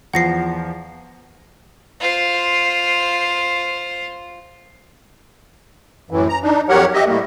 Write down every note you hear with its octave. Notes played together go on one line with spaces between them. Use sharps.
E2 F3 F#5 A#6 C7
F4 C5
F#2 A2 E3
A#5
D4 D#4
F2 F#3 G4 A#4 C#5 F#5
G4 D#5 E5
A2 G3 A3 A#3